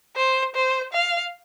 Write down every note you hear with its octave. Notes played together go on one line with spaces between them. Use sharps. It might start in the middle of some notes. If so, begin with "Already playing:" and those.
C5
C5
F5